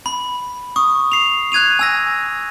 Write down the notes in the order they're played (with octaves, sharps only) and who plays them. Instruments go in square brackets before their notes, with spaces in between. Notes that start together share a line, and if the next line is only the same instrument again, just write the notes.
[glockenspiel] B5
C#6 D#6
C7 F7
F#6 G#6 D#7 F7
G#5 E6 A#6